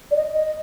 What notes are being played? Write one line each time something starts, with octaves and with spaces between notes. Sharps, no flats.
D5
D#5
D#5